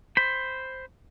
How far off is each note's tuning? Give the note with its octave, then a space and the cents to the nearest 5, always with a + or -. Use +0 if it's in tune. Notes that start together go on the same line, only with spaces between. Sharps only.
C5 +0 B5 +10